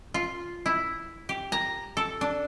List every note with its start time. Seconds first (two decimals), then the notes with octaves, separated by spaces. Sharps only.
0.14 F4
0.66 E4
1.29 G4
1.52 A#5
1.97 A4
2.21 D4